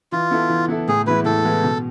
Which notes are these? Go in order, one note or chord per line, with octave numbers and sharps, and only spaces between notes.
E3 F4
B3 E4 A4
E3
B3 E4 A4
A2 G#4
E3 G#3 B3 E4 B4
A2 A4
E3 G#3 B3 E4
B2